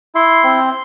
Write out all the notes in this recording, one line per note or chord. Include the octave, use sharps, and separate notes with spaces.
E4 C6
C4